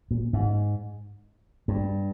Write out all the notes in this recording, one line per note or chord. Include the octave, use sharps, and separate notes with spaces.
A#2
G#2
G2